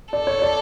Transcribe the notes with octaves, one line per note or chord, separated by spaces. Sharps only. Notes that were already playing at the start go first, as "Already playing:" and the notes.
A4 D5
C#5
D5